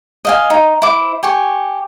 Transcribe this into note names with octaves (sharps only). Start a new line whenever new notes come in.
D#5 F5 G#5
D#4
E4 C5 D6
G4 G#5 C#6